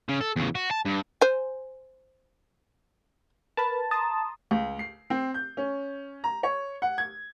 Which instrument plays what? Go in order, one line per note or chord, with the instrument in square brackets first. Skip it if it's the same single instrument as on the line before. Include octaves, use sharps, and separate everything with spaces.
[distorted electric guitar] C#3
A4
E2 C#3
F#4
A5
G2
[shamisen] C5 G#5
[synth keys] A#4 B4 B5 [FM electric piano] A5
[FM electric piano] A5 [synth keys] A#5 C6 D#6
[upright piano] C#2
C7
C4
G6
C#4
A#5
C#5
F#5
G#6